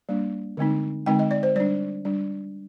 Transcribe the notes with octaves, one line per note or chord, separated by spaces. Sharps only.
G3 A#3 D4
D3 G#3 C4 D#4
D3 G#3 C4 D#4 G5
D#5
D5
C5
G3 D4 D5
G3 D4